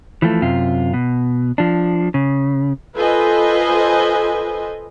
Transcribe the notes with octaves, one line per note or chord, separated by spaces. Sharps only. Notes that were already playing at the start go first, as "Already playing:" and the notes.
E3 F3 A3
F#2 C3 F4
B2
F3 D4
C#3
F4 A4 B4 C5 D#5 G#5